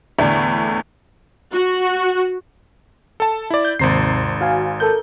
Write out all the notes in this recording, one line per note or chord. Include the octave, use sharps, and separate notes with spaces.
E2 A2 D3 A3 D4
F#4
A4 A5
E4 D5
G6
G#1 D#2 C3 C5 A#5 C7
F#4 F5 G#5
A4 A#4 G6